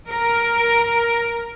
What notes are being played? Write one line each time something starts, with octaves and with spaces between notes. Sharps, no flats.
A#4